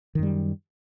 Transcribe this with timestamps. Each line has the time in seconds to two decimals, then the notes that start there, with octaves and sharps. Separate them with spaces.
0.15 D#3
0.19 F#2
0.23 G3